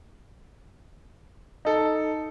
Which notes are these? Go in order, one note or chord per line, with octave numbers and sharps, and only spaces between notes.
D#4 A4